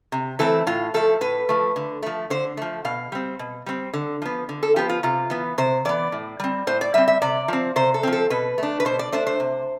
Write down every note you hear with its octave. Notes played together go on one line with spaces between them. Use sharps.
C3
E3 A3 C4 A4
A2 F4
F3 A3 A4
A2 B4
F3 A3
D3
F3 A3
D3 C5
F3 A3
B2 F5
G3 C4
B2
G3 C4
D3
F3 B3
D3
A4
F3 B3 G4
F4
C3 F4
E3 B3
C3 C5
E3 B3 D5
A2
G3 C4
A2 C5
D5
G3 C4 E5
E5
C3 D5
F3 C4
C3 C5
A4
F3 C4
A4
B2 B4
A3 D4
B4
B2 C5
D5
A3 D4 C5
C5
C3